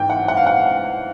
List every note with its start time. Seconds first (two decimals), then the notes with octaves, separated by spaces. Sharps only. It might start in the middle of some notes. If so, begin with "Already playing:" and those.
Already playing: G#2 E3 G#3 B3 G5
0.10 F#5
0.28 F#5
0.37 F5
0.47 F#5